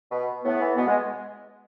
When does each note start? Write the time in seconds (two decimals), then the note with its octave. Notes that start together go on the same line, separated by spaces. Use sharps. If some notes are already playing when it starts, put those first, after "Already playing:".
0.10 B2
0.44 A2 B3
0.60 E3
0.76 B2 B3
0.87 G#3